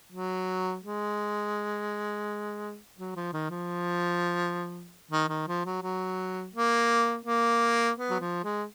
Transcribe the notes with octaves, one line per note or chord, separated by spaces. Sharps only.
F#3
G#3
F#3
F3
D#3
F3
D#3
D#3
F3
F#3
F#3
A#3
A#3
B3
F#3
F3
G#3